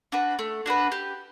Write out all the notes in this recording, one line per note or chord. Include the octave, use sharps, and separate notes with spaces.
D4 F#4 B4
A3
D4 F#4 B4
G4